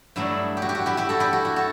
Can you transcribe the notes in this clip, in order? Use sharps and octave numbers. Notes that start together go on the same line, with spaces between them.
G2 F#3 A3 D4 E4
G4
F#4
G4
F#4
E4 G4
E4 G4
F#4 A4
E4 G4
F#4
F#4
F#4 A4